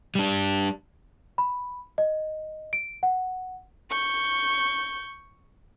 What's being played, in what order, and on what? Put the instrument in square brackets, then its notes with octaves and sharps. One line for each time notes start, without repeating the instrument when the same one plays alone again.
[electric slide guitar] G3 D4
[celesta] B5
D#5
D7
F#5
[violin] C#6 G6